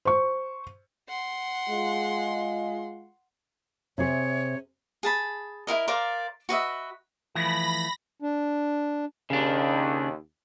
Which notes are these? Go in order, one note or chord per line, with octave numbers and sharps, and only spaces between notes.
C5 C#6
F#5 C6
G#3 F4
C3 G#4 C#5 E5
G#4 A5 B5
E4 F#4 A#4 D#5
A#4 C5 D5 F5
F#4 B4 D#5 E5
E3 F3 A3 B5 A#6
D4
D#2 C#3 D4